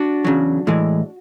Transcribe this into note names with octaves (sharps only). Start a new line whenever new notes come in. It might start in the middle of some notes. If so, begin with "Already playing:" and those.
Already playing: D4 F#4
E2 C#3 F#3
A2 E3 G#3